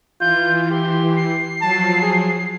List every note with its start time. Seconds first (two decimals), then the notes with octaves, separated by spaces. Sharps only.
0.21 E3 F4 G6
0.70 G4 C6
1.16 C7
1.62 F3 F#3 A5
2.02 G#4